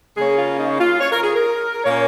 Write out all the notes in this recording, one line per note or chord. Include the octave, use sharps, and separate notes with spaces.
C#3 A#3 C#4 G#4
F4
D#4
F4
C#5
A#4
G#4
A#4
A#2 A#3 C#4 C#5